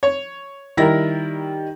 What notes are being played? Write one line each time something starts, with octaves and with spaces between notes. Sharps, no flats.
C#5
D#3 G3 E4 A#4 A#6